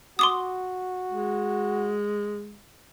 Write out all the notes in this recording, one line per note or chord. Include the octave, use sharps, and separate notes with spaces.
F#4 C6 D6 D#6
G#3